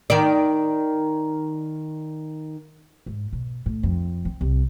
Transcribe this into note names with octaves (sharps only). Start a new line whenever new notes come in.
D#3 D5
G#2
B2
A2
F2
C4
C2